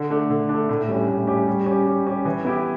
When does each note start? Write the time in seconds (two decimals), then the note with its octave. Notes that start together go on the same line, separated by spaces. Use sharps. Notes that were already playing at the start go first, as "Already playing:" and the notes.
Already playing: D3
0.10 A3 D4
0.30 D3
0.49 A3 D4
0.69 A2
0.88 G3 C#4 G4
1.08 A2
1.27 G3 C#4 G4
1.48 G3
1.66 C#4 G4
1.87 G3
2.07 C#4 G4
2.25 E3
2.45 B3 E4 G4